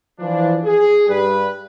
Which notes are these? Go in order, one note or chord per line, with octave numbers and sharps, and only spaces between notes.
E3 F3 D4
G#4
G2 G3 B4